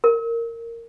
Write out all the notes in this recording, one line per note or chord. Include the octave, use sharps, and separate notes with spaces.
A#4